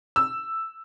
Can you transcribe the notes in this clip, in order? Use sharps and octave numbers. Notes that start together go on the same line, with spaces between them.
E6